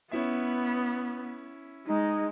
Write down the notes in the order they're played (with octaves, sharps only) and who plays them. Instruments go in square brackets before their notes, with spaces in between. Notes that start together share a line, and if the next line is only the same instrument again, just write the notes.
[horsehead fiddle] B3 [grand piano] C#4 E4 E5
[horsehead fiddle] G#3 [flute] D#4